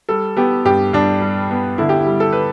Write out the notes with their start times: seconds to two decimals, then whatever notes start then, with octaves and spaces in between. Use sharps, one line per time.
0.09 G3 A4
0.37 B3 G4
0.65 G2 G4
0.93 G2 D4
1.21 G3
1.51 B3
1.78 D3 E4
1.89 G4
1.99 E4
2.07 G3
2.20 A4
2.33 B4